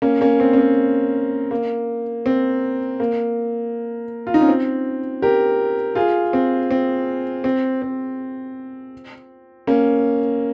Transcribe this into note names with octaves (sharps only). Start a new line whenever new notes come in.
A#3 C#4
A#3 C#4
C4
C#4
C4
A#3
C4
A#3
F4
D#4
C#4
C4
G4 A#4
F4 G#4
C4
C4
C4
C4
A#3 C#4